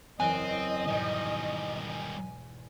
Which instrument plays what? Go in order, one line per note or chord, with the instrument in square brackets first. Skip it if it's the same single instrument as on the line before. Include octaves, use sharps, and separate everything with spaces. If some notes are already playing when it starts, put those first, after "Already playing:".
[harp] F#1 E2 F#6 [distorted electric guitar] C4 [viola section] D#5 [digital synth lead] G#5
[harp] G#2 B2 G5 [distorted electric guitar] D#3 G3